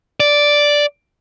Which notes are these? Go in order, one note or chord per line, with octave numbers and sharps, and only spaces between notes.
D5